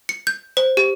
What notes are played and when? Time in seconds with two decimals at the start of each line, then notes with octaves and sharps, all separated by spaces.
0.09 C#7
0.27 G6
0.57 C5
0.77 G4